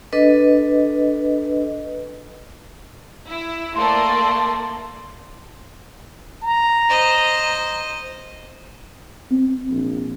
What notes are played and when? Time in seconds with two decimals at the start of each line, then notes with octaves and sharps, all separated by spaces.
0.13 D4 A4 B4 D#5
3.28 E4
3.75 A3 A#3 D5 C6
6.43 A#5
6.89 C5 D#5
9.31 C4
9.71 A#1